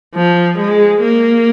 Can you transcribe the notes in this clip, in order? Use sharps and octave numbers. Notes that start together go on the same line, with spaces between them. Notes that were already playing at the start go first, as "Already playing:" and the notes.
F3
G#3
A#3